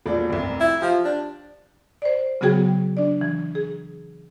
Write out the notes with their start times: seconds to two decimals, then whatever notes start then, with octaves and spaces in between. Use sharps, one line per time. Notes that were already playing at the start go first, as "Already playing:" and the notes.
0.06 E1 A#2 D5
0.30 F1 C2
0.60 E4
0.82 F3 G4
1.05 D4
2.02 C5 D5
2.41 C#3 F#3 B3 F#4 G#4 G5
2.97 D4 D5
3.21 E3
3.55 G#4